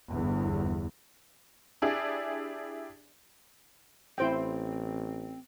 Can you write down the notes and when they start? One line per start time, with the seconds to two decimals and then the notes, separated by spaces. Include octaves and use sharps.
0.11 G1 E2
1.82 D4 E4 G4 G#4 D5
4.18 A1 C4 E4 C5 G5